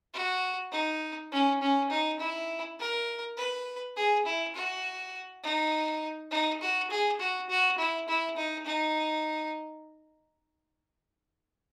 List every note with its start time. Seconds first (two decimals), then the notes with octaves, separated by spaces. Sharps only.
0.14 F#4
0.72 D#4
1.32 C#4
1.61 C#4
1.90 D#4
2.19 E4
2.79 A#4
3.37 B4
3.96 G#4
4.25 E4
4.55 F#4
5.43 D#4
6.31 D#4
6.61 F#4
6.90 G#4
7.19 F#4
7.49 F#4
7.78 E4
8.08 E4
8.36 D#4
8.66 D#4